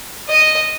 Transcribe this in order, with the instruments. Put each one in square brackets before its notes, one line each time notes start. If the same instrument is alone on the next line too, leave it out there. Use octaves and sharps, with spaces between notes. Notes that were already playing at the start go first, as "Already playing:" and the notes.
[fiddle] D#5